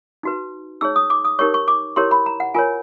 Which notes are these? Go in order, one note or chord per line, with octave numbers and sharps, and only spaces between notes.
D#4 F#4 B4
D#4 G#4 C#5 E6
D#6
D6
D#6
D#4 G4 A#4 C#5 C#6
C#6
D6
E4 G4 A#4 C#5 C6
B5
A#5
F#5
F4 A#4 C#5 G#5